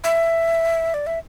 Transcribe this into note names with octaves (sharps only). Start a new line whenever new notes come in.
E5
D5
E5